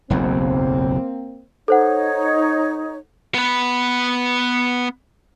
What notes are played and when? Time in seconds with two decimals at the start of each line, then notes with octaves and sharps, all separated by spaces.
0.10 F#1 B1 E2 A#3 C4
1.68 D#4 A4 C5 C#5 F#5
3.34 B3 B4